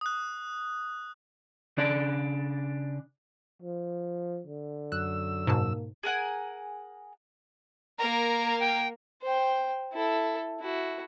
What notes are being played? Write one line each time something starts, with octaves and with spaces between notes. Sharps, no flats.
D#6 F#6
C#3 D4 D5
F3
D3
F#2 E6 F#6
G#2 B2 A#3 A5
G#4 A#4 F#5 G#5
A#3 A#4 A#5
G5
C5 G5
E4 A4
E4 F#4